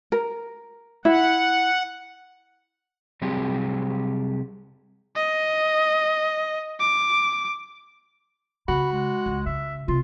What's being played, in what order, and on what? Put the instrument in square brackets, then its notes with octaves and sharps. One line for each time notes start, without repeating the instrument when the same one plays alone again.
[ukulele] A#4
[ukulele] E4 [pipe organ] F#5
[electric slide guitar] C3 F#3 G3 C4 G4 G#4
[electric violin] D#5
D6
[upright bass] C#3 [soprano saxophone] F#4 [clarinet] B5
[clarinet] G#3
[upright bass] C#2
[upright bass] C#3 [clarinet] E5
[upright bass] C3 [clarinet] F4